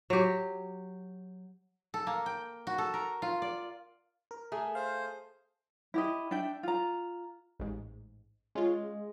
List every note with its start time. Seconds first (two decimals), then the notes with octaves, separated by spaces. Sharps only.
0.10 F#3 G4
1.94 A4
2.07 A#3
2.26 G5
2.67 F#4
2.78 A4
2.94 A#4
3.22 F4
3.42 D5
4.31 A#4
4.52 A3 G#4
4.75 C5 F5
5.94 E4 G4 D#5
6.31 D4 E5 G5
6.63 F4 A#5
7.59 A1 G#2
8.55 G#3 C#4 F4